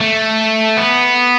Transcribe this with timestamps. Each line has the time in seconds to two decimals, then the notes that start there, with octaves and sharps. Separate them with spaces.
0.01 A3
0.77 B3